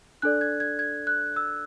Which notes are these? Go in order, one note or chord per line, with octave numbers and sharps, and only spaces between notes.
D4 A4 D5 F#6
G#6
G#6
G#6
F#6
E6